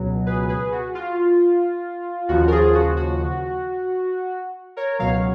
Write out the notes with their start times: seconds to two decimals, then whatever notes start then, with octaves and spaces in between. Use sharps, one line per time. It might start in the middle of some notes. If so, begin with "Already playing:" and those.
Already playing: C#2 B2 F#3
0.27 G#4 B4
0.49 G#4 B4
0.72 F#4
0.95 F4
2.29 D#2 C#3 F3 F#4
2.48 A#4
2.52 F4 G#4
2.75 F#4
2.97 F#4
4.77 A#4 C#5
4.99 C#2 B2 F#3 C#5 F5